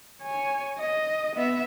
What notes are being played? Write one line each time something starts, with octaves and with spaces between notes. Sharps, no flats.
C#5 G#5
D#5
B3 E5